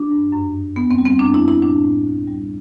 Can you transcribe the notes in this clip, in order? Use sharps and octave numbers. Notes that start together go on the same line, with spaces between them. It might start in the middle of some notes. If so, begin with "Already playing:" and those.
Already playing: D4
G2
F#2
F#2
E2 B3
C4
G3
C4
F#2 D4
E4
F#2
E4
A2 D4
A2
D2
G3